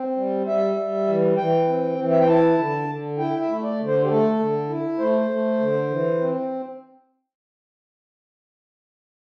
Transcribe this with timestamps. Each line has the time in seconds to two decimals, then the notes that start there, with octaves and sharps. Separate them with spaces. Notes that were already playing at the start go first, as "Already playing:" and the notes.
Already playing: C4
0.17 G3
0.47 G3 E5
0.77 G3
1.08 E3
1.37 E3 G5
1.67 C4
1.98 E3
2.11 E5
2.20 G5
2.27 E4 A5
2.58 D3
2.88 D3
3.18 E4 G5
3.41 E5
3.48 A3
3.63 D5
3.79 D3
3.86 C5
4.04 G4
4.08 A3 A4
4.39 D3
4.69 E4
4.99 A3 C5
5.30 A3
5.59 D3
5.90 E3
6.20 C4